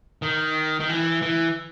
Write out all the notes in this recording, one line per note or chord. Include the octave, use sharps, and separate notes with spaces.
D#3
D#3
E3
E3